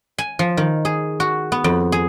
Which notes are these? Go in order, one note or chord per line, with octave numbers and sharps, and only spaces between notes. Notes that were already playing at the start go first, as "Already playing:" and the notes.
G#5
F3
D#3
G#4
F#4
B3
F2
G#4